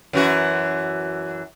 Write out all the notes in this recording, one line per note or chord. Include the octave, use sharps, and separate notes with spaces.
F#2 E3 F#4